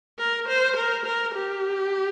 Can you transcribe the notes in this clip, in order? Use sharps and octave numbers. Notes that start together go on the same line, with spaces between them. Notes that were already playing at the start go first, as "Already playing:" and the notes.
A#4
C5
A#4
A#4
G4